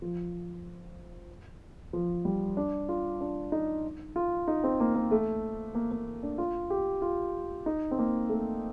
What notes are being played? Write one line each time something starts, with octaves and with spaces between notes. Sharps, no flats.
F3
F3
G3
D4
F4
D4
D#4
F4
D#4
C4
A#3
A#3
A3
A#3
A#3
D4
F4
G4
F4
D#4
C4
A#3
A3